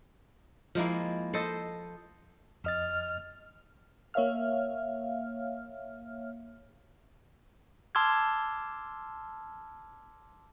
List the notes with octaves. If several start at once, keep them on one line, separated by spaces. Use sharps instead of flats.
F3 G#3 A#3 E4
A4 C5 D#5
F2 D#5 F6 A6
A#3 C#5 E5 F5 F6
A5 C6 D6 E6 F6 G#6